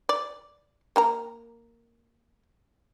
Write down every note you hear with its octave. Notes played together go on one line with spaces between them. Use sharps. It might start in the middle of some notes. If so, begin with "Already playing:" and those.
D5
A#3 A#4 A#5